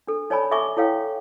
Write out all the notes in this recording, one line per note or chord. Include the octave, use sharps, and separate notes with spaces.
D4 A4
D#4 C#5 D5 G#5 A5 B5
A4 E5 G#5 C#6 D6
E4 A4 C#5 F5 G5